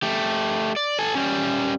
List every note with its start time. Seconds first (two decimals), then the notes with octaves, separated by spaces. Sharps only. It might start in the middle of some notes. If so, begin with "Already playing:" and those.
0.03 A3 G4
0.76 D5
0.99 A4 G#5
1.15 G3 C#4